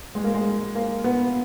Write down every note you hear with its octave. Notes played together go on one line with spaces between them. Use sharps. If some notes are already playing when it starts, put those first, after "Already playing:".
G#3
A#3
G#3
A#3
B3